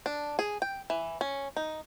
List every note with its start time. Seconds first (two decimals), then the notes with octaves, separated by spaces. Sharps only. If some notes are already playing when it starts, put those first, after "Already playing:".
0.06 D4
0.39 G#4
0.62 G5
0.90 E3
1.21 C#4
1.56 D#4